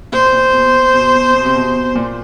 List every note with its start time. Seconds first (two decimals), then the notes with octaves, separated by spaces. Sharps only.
0.12 A#2 C5
0.32 A#2
0.53 B2
0.94 B2
1.14 B2
1.34 B2
1.45 C3
1.56 B2
1.95 A#2